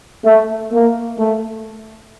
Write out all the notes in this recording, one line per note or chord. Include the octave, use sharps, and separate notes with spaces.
A3
A#3
A3